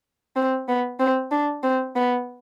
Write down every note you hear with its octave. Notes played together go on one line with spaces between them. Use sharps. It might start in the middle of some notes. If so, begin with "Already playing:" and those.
C4
B3
C4
D4
C4
B3